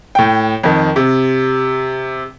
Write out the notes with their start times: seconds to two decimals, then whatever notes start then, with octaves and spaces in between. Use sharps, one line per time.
0.15 A2 G5
0.63 F2 D#3
0.96 C3